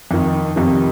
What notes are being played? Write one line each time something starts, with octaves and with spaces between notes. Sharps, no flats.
F2 D#3
F2 C3 D#3